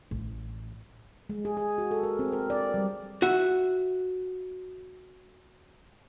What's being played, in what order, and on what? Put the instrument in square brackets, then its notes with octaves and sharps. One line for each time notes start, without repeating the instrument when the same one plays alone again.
[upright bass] A1
[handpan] G#3
G#4
G#4
F#4
A4
A#4
C4
A#4
D5
G3
[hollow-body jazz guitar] F#4 E5